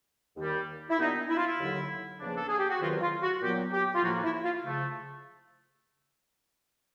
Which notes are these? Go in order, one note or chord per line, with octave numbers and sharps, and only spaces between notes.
D#2 D#3 G3
E4
A#2 G3 B3 D4 D#4
E4
F4
E4
D#2 D3 F#3
E2 C#3 F3 A#3 D4
A4
G#4
G4
F#4
E2 C3 D#3 F#3 F4
F4
F#4
A#2 F#3 B3 G4
G4
F4
A2 F3 A#3 F#4
E4
F4
C#3 F3 A3